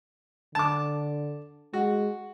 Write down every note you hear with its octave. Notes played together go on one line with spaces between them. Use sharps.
D3 A5 D6
G#3 F#4